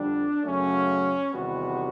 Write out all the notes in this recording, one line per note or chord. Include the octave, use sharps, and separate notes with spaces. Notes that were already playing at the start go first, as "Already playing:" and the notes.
Already playing: F2 D3 G3 D4
F#2 C#3 F#3 A3 C#4
E2 C3 D#3 G3 B3 F#4